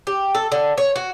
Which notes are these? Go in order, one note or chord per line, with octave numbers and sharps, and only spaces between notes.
G4
A4
D3
C#5
F#4